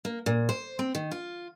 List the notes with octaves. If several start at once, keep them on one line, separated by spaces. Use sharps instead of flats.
A#3
A#2
C5
C4
D#3
F4